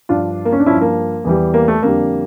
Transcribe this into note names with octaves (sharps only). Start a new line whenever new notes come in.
G2 F3 D4 F4
A#3
C#4
D4
G2 F3 C#4 E4
A#3
E2 E3 G3
A#3
A3
F2 D3 G3 A#3